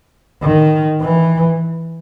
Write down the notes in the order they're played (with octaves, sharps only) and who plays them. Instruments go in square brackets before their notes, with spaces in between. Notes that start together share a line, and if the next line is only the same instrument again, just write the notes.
[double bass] D#3
E3